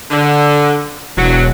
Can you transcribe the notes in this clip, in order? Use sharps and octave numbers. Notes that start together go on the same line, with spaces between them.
D3
E1 F#3